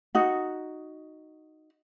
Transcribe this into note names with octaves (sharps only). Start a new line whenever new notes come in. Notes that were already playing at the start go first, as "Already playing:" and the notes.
D#4 F#4